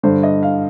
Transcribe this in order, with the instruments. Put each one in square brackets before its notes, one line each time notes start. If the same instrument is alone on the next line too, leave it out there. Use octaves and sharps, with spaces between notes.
[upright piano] G2 D3 C5
D#5
F5